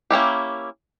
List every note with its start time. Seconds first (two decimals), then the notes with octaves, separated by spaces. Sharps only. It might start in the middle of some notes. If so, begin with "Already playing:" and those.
0.10 A#3 C#4 E4 G4